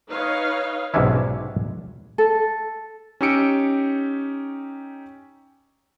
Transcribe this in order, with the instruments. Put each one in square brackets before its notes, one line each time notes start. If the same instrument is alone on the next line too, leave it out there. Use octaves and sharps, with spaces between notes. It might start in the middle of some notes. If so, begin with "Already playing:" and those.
[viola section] D#4 B4 C#5 D#5 F5
[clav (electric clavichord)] B1 G#2 C3 C#4 D4 E4
[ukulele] A4
[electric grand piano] C#4 D#4 G4 E6 C#7 D7